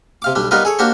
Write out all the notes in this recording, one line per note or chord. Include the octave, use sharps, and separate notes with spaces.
C3 F5 D6
B1 G3 D4
G3 B3 D#4 F4 A#4 B4
G#4 A4 C#5
A#3 D4 F#4 G4 C5